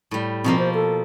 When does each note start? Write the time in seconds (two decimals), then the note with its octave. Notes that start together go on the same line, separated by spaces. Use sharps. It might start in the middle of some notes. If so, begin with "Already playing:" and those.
0.11 A2 G3
0.44 B2 F3 A#3 C4
0.59 C5
0.74 A4